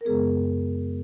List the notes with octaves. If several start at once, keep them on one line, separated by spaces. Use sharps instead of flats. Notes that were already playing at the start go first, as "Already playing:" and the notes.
A#4
F#2 C#3 G#3 B3 G#4